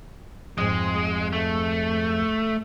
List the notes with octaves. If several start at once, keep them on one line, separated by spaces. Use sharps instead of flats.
F2 G#2 G#3
A3